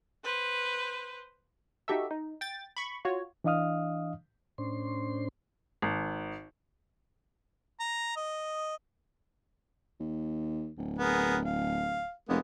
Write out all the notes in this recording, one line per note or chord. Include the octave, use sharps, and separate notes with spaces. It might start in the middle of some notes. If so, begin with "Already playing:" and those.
B4 C5
D#4 F#4 G4 A4 E5
D#4
G5 A6
B5 C#6
F4 F#4 C#5
E3 D4 D#5 F5 D#6 F6
A2 C#4 D4 C5 C6
G#1
A#5
D#5
D#2
D1
B3 G#4 A#4
F5
F1 G#3 A#3 B3